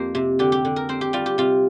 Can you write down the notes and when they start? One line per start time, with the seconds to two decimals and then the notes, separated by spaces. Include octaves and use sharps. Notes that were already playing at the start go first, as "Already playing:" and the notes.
Already playing: F2 A#3 G4 C5
0.15 C3
0.39 D3 G4
0.52 G4
0.65 D3
0.76 A#4
0.89 C4 C5
1.01 G4
1.13 G3 F4
1.26 G4
1.38 C3 F4